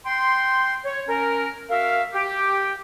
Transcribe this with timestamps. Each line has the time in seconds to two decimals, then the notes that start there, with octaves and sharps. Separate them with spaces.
0.06 G5 C6
0.85 C#5
1.08 C#4 A#4
1.70 F#4 A#4 E5 F5
2.14 G4